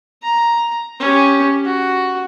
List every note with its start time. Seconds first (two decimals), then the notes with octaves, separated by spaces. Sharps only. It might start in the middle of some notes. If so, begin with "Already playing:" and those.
0.23 A#5
0.99 C#4 G4
1.65 F#4